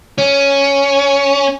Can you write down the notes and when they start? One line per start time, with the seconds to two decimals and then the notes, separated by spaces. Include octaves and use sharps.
0.18 C#4